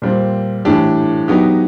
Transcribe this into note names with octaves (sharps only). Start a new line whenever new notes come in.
A#2 G3 C4
A2 E3 A3 D4 G4
F#3 B3 D#4 G4